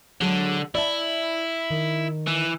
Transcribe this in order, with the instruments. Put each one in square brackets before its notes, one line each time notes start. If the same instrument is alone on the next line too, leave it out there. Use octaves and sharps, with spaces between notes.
[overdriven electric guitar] D3 [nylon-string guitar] F#3 G#3 G#4
[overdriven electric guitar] E4 [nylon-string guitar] D5 E5 A5
[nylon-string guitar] D#3
[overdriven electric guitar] E3